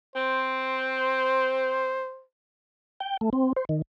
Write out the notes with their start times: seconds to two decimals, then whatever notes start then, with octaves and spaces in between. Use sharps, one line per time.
0.16 C4 C5
3.00 G5
3.21 A3
3.33 C4
3.56 C5
3.69 D#3